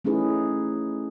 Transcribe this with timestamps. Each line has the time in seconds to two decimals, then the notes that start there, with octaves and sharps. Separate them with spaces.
0.05 A3 C#4 D#4 E4 G#4 B4